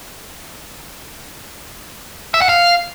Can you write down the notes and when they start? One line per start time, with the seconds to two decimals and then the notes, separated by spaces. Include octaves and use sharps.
2.34 E5
2.41 F#5
2.49 F5